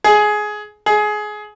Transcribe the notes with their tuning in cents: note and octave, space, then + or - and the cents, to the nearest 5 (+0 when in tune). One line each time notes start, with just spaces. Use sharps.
G#4 +15
G#4 +20